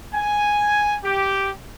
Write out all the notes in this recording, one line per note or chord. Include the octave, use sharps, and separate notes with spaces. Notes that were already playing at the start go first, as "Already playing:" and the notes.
G#5
G4